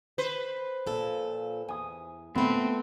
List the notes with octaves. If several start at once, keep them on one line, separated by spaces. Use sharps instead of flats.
B4 C5
A#2 F3 A4
E2 G#5 D#6
A#2 A3 B3 C4